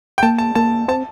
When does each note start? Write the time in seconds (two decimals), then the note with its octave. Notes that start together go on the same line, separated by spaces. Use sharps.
0.18 G5
0.23 A#3 A5
0.38 A5
0.55 A#3 A5
0.88 C4 A5